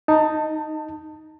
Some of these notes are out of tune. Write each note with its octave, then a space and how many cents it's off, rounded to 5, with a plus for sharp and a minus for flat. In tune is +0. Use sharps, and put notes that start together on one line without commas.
D#4 +0 A5 +25